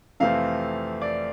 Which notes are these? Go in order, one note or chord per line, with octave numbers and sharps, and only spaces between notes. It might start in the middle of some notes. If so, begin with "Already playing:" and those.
F2 C3 E3 A3 C4 F5
D5